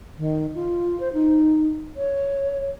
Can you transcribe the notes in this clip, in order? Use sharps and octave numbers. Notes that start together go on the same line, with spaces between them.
D#3
F4
C5
D#4
C#5